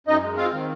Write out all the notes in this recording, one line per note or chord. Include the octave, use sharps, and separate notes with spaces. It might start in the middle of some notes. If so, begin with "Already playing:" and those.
F#2 D#4 D#5
G#3
C4 F4 F5
D#3